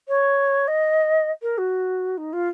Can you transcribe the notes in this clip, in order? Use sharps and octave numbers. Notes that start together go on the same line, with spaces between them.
C#5
D#5
A#4
F#4
D#4
F4